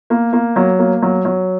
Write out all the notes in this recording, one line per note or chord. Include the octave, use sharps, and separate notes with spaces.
A#3
A#3
F#3
A#3
F#3
F#3